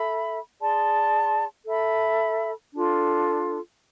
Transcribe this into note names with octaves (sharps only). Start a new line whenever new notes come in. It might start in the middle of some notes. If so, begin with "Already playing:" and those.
Already playing: A4 E5 B5
G#4 D5 A5 C6
A4 E5 B5
D4 F4 A4